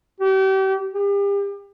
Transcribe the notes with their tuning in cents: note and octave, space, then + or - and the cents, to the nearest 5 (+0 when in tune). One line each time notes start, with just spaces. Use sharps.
G4 -35
G4 +35